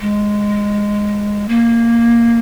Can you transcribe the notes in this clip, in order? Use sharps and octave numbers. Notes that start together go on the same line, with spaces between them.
G#3
A#3